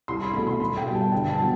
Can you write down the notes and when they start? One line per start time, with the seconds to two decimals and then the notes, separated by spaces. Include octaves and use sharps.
0.08 C2 C6
0.21 B5
0.34 B2 A3 B5
0.47 C6
0.60 B1 B5
0.77 G5
0.86 B2 G3
0.95 A5
1.12 G1 G5
1.30 A5
1.40 F#3 B3